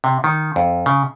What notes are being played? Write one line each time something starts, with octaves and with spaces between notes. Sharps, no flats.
C3
D#3
F2
C#3